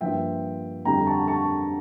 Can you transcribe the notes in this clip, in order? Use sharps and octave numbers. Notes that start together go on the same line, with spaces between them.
G2 F3 A#3 E5 G5
F2 D3 G3 G5 A#5
A5 C#6
A5 C#6